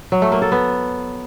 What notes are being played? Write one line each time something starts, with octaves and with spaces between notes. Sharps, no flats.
F#3
A3
A#3
A4
B3